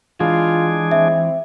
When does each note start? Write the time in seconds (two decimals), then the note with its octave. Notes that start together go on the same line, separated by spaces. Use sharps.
0.20 E3 G#3 D4 F4 G#4
0.91 C4 E5